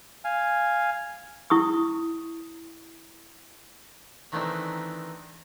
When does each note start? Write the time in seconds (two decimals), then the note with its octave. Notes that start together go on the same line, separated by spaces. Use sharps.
0.25 F5 G#5
1.50 E4 C#6 D#6
4.32 D#3 E3 A3 C4 D4 D#4